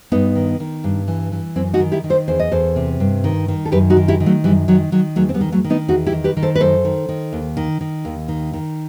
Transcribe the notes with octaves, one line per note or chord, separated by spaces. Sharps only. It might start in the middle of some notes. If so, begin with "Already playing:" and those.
G2 B3 D#4
D#3
D#3
G2
E3
E3
F#2 C4 E4
D#4 F#4
D#3
E4 G4
D#3
A4 C5
E2 C5
D#5
E2 A4 C5
C3
G2
D#3
D#3
A4
F#2 G4 B4
D#4 F#4
D#3
E4 G4
D#3
F#3 A3
F#2 E3 G3
D#3 F#3
D#3 F#3
E2 F#3 A3
C4
G3 B3
D#3
F#3 A3
D#3
B3 D#4
E2 D#4 F#4
E4 G4
D#3
G4 B4
D#3
A4 C5
B4
F#2 A4 C5
D#3
D#3
D#2
D#3
D#3
D#2
D#3
D#3